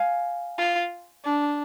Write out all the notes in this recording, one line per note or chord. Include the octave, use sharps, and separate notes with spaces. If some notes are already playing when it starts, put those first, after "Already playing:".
Already playing: F5 G#5
F4
D4